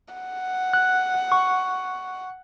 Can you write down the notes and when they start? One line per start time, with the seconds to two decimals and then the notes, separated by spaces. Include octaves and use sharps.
0.14 F#5
0.73 F#6
1.32 C#6